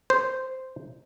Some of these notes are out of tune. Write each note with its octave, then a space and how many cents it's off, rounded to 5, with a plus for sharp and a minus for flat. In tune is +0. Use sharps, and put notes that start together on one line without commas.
C5 -5